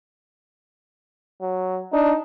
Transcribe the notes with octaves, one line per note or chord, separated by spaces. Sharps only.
F#3
D4 D#4